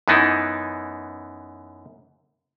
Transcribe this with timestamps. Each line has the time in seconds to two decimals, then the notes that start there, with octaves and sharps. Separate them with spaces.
0.08 F#2 E3 B3 D#4 E4